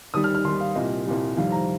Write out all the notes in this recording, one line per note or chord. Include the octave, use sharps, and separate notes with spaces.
D#2 D#3 G3 D#6
F6
F6
D#2 D#3 G3 C6
F5
C2 A#2 G3 D#5
C2 A#2 G3
F2 C3 D#3 G3 F5
A#5